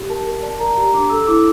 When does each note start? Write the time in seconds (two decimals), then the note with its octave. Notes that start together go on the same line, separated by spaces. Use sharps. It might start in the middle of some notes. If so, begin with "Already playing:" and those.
Already playing: G4
0.09 A#4 A5
0.26 A#4
0.43 D5 A5
0.59 A#4 A#5
0.77 G4 A#5
0.94 D4 D6
1.10 A4 E6
1.27 E4 D6